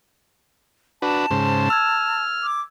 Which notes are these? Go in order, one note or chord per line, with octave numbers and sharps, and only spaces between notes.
D4 F#4 B4 A5
G#2 C#3 C5
E6 F6 G#6
D6